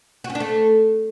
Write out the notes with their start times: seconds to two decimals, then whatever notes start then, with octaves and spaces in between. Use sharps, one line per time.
0.24 F#4
0.30 C#4
0.35 D4
0.40 A3